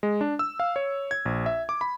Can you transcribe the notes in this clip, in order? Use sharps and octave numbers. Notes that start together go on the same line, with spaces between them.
G#3
D4
E6
F5
C#5
G#6
A#1
E5
D6
B5